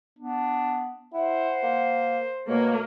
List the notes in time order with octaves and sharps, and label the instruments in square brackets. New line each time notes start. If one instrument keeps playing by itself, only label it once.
[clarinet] B3 [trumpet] D4
[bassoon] E4 [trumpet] C5 [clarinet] F#5
[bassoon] A#3
[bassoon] B2 [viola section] A#3 [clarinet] C#5